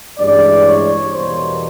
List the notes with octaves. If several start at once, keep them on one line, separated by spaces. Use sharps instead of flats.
A1 G2 E3 G#3 D5
C#5
E2 B2 G3 A#3 C5